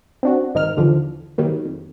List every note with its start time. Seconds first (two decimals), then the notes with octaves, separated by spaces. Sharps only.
0.23 C4 D4 F#4
0.54 A#1 G#2 D#3 D#4 A#4 F6
0.77 D#2 D3 E3 F3
1.38 D#3 F#3 G3 A#3
1.65 F2